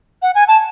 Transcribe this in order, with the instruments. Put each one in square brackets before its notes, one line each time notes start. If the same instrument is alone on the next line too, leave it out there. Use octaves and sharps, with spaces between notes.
[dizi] F#5
G#5
A5